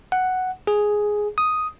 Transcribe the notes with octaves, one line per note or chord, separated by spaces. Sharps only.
F#5
G#4
D#6